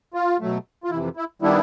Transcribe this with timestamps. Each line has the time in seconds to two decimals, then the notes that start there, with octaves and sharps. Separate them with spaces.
0.14 F4
0.40 B2 F#3 A3
0.84 F4
0.91 F2 C3 E3 E4
1.17 E4
1.42 D#3 G3 B3 D4 E4